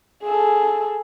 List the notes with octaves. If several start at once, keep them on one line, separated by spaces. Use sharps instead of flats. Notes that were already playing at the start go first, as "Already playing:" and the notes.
G#4 A4